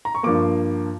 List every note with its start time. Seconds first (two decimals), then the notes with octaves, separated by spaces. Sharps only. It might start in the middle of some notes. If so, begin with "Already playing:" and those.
0.05 A#5
0.15 C#6
0.23 G2 F3 A#3 D6